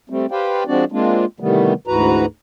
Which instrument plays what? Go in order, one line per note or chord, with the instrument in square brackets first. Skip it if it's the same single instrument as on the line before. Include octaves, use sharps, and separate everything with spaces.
[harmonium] G3 A3 C4
G4 B4 C5 D5 F5 G5
F3 G#3 C4 D4 F#4 D5
G#3 A#3 C4 D4 F4
C3 D#3 E3 G3 A3 B3
D2 G#2 E3 F#4 B4 A#5